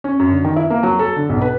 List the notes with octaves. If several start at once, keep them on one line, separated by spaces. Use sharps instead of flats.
C#4
F#2
D3
D#3
E4
A#3
F#3
A4
D3
B1
B4